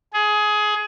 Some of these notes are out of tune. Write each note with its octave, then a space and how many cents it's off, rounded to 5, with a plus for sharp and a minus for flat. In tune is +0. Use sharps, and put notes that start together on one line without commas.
G#4 +20